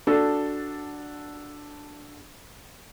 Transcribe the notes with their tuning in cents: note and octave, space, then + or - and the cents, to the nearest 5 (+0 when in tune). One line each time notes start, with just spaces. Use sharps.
D4 +0 F#4 +0 A4 +0